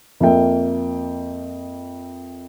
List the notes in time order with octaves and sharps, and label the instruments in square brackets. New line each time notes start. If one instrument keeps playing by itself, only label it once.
[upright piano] F2 A#3 E5 G5